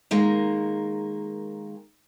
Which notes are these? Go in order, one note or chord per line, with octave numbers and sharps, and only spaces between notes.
D#3 G#3 A#3